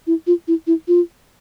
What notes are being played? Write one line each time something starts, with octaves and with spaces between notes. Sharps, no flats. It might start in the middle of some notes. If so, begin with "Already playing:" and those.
E4
F4
E4
E4
F4